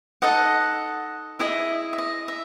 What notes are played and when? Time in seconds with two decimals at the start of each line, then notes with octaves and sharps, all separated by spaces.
0.22 D#4 A4 D#5 F#5
1.39 E4 G#4 D#5 E5
1.93 E5
1.98 D#5
2.28 E5